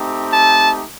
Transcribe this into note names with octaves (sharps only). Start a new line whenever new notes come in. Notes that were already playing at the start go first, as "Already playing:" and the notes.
Already playing: A3 C4 D#4 G4
A5